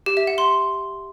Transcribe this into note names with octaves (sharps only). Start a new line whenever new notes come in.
G4
E5
F#5
C6